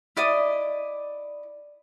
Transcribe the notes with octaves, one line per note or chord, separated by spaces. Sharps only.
E4 D5 D#5 D#6